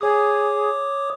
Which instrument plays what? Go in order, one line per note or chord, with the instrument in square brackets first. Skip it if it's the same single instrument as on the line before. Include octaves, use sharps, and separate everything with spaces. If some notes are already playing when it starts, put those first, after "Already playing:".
[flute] G#4 [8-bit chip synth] C#5 D6 D#6